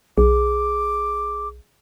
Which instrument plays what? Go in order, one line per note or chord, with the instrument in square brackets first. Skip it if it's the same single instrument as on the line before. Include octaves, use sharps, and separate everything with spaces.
[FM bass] B1 [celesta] G#4 [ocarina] D6